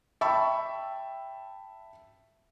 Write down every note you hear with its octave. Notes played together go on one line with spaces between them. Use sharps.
E5 G5 A5 B5 C#6 E6